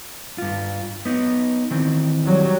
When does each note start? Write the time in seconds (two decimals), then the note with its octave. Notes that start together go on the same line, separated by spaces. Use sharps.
0.38 G2 F4
1.05 B3 D#4
1.71 D#3 E3 C4
2.25 F#3 G3